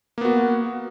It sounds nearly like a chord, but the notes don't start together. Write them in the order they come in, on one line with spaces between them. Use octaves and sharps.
A#3 B3 F#4